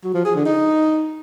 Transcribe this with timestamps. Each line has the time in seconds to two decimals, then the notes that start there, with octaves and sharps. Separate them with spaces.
0.04 F#3
0.14 F3
0.25 G#4
0.35 D3
0.45 D#4